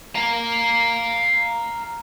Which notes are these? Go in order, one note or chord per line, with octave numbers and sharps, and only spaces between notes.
F5 A#5